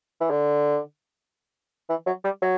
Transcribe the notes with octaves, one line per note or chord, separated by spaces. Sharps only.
E3
D3
E3
F#3
G3
F#3